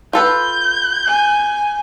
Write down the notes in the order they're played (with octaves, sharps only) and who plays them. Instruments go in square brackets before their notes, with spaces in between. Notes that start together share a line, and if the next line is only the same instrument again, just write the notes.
[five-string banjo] F4 A4 B4 [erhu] G6
[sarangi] G#5